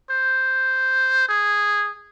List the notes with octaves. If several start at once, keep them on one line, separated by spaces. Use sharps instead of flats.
C5
G#4